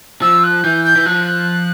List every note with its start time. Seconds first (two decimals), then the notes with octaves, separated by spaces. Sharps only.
0.22 F3 E6
0.44 F#6
0.63 E3 G6
0.85 G6
0.96 E3
1.06 F3 F#6